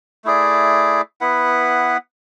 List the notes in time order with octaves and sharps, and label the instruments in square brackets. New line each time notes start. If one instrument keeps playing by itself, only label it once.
[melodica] A3 E4 G#4 D5
B3 E4 B4 F#5